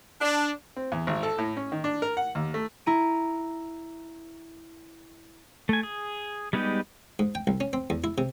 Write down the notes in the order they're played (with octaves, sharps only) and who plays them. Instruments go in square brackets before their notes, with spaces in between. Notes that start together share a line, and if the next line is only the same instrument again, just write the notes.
[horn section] D4
[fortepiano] C4
E2
G#1
A4
A2
C#4
D#3
D4
A#4
F#5
D#2
A3
[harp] E4 A#5 D#7
[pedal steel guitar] A3 G#5
G#4
G3 G#3 B3 D#4 G4
[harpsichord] G#2
G5
C2
C#4
C4
E2
E4
C3